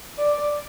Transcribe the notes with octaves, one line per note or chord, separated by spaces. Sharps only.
D5